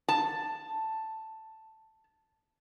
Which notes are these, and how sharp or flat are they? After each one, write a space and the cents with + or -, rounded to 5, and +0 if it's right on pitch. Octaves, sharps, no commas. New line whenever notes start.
A5 +5